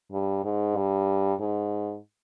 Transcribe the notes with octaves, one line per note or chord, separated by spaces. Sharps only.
G2
G#2
G2
G#2